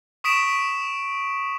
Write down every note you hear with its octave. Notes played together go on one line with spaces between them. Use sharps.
C#6 D#6 B6 D7 E7